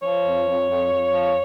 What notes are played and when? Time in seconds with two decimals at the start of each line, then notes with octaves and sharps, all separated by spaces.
0.03 F3 C#5
0.25 F2
0.47 F2
0.69 F2
0.91 F2
1.13 F3